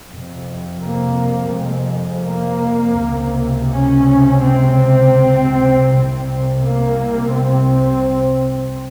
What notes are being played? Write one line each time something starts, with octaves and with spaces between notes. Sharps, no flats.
F2 C3
A#3
G#3
A#3
C#2 C3
C#4
C4
C2 C3
A#3
C4